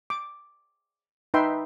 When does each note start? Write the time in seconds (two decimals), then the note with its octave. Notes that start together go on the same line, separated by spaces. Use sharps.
0.10 D6
1.34 D#4 B4 E5 G5 C6